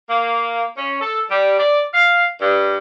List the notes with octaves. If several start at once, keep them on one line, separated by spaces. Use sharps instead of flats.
A#3
C#4
A4
G3
D5
F5
G2